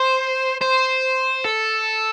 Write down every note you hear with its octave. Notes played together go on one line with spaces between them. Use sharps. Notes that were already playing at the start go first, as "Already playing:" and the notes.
Already playing: C5
C5
A4